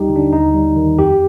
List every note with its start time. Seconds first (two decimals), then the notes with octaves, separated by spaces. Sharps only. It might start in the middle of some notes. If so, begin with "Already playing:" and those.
Already playing: D#2 G3 D#4 G4
0.09 D3
0.16 D4
0.32 D#2 D#4
0.54 G3
0.76 D#3
0.98 F2 G4